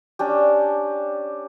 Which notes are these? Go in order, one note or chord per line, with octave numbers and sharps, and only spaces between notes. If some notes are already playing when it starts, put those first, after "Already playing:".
C#4 D4 G4